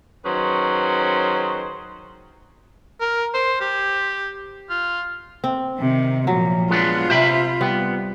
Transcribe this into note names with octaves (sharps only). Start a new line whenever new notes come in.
D#3 F#3 C#4 G#4 B4 C5
A#4
C5
G4
F4
C4
C3 D#3
A#2 F3 F#3
G#3 B3 D4 F4
C3 C5 E5 B5
G3 B3